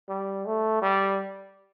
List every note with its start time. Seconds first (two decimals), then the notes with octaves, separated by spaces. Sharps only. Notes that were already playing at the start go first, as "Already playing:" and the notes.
0.09 G3
0.46 A3
0.82 G3